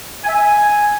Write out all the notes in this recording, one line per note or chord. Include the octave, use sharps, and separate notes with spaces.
G#5
E5
G#5